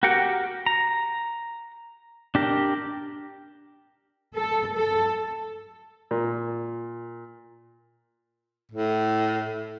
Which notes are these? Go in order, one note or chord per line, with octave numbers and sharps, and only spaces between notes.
F#4 G4 A#4 F#5 G5
A#5
D4 G4 A#4
A4
A4
A#2
A2